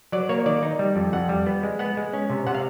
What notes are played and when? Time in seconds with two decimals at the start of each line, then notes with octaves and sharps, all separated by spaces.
0.12 F#3 D5
0.29 A#3 C#5
0.46 D#3 D5
0.63 D#4
0.79 G3
0.96 F2
1.13 F2 F#5
1.29 G3
1.46 B3
1.63 G#3
1.79 B3 F#5
1.97 G#3
2.13 C#4
2.30 C3
2.47 C3 F#5
2.55 F5